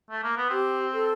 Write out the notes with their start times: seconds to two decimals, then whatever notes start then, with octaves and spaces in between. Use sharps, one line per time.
0.10 A3
0.23 A#3
0.37 B3
0.49 C4 G4
0.93 A4